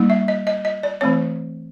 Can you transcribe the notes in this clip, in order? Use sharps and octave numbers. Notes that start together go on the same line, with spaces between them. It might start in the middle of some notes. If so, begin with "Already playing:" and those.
Already playing: G3 A#3 D#4
E5
D#5
D#5
D#5
D5
E3 A3 C4 C#5